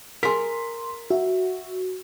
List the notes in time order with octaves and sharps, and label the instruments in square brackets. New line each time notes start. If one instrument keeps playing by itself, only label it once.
[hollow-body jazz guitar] G#4 A#4 [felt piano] C6 B6
[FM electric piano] F#4 [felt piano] E5